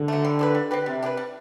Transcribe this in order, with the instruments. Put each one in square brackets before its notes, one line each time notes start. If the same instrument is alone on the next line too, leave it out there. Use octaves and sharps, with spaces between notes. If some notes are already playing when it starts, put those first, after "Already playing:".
Already playing: [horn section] D3
[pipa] F#3 A3
G3
C4 G4 B4
G3
C4 G4 B4
[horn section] C3 [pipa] G3
[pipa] D4 G4
B4
G3